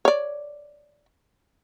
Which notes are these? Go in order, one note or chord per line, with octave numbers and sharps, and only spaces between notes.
C#5 D5